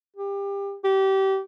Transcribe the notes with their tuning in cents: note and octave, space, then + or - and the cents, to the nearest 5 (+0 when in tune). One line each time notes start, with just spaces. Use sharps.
G4 +25
G4 -25